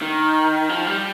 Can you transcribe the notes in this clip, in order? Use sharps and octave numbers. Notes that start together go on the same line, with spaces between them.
D#3
F3
G3